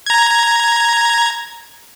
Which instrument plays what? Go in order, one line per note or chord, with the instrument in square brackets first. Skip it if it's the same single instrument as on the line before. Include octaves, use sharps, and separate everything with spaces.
[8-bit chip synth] A#5 G#6